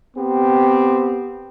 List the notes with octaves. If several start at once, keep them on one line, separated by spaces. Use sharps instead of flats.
B3 C4 G4